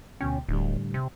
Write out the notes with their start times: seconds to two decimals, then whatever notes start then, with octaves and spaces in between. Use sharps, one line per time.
0.21 D2 B2 C#4 G5
0.49 D1 A2 D3 G3
0.94 C3